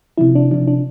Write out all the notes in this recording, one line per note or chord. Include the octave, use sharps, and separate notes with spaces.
C3 F3 E4
D4
C3 F3 D4
D4